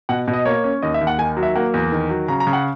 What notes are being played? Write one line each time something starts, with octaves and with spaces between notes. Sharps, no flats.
B2 F#5
B2
D#5
A#3 C#5
C#4
D#2 D#5
E5
D#2
F#5
D#3 G#5
F#3
E5
A#3 F#5
E2
D#3
F#3
C#3 A#5
A#5
C#3
F#5